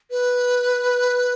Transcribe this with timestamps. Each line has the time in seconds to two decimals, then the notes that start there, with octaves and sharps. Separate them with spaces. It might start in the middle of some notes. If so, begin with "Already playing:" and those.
0.11 B4